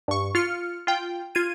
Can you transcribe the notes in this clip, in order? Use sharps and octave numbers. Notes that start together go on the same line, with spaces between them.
G2 C#6
F4 F6 C#7
F4 G5
F4 G#6 D#7